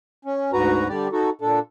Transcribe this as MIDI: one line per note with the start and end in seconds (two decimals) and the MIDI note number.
0.25 0.51 61
0.53 0.88 38
0.53 0.88 44
0.53 0.88 66
0.53 0.88 71
0.53 0.88 82
0.89 1.08 50
0.89 1.08 55
0.89 1.08 67
0.89 1.08 74
1.12 1.30 63
1.12 1.30 66
1.12 1.30 69
1.41 1.59 46
1.41 1.59 62
1.41 1.59 69